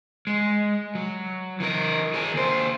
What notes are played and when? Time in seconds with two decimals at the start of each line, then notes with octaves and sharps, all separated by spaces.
0.27 G#3
0.95 F#3
1.60 E3 A#4
2.14 G#4 A#4
2.34 D#2 C5